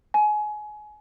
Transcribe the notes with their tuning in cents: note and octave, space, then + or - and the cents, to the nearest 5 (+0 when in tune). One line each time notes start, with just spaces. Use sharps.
G#5 +25